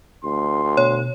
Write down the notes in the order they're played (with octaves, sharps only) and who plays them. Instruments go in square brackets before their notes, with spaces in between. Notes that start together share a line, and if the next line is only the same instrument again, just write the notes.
[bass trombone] D2 [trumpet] C6
[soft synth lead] B2 [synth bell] C#5